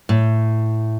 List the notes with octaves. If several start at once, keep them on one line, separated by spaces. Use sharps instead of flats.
A2